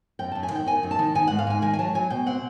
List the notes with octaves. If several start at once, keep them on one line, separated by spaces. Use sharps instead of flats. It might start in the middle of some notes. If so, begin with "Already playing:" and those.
F#2 G5
F#2 A5
G#5
D#3 G5
D#3 G#5
F#2
A5
D#3
D#3 G#5
G#2 F#5
F5
G#2 G#5
D#3 G#5
G#5
F#3 A5
F#3 G#5
B2 G5
C4 F#5